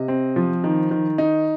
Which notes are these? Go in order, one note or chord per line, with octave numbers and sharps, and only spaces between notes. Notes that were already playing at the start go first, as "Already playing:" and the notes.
Already playing: C3 D#5
C4
F3
D#3
D#3
D#4